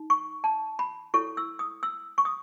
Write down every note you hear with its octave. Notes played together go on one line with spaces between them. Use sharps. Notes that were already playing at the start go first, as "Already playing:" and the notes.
Already playing: D#4
C#6
A5
B5
E4 A4 C#5 C#6
E6
D#6
E6
C#6
D#6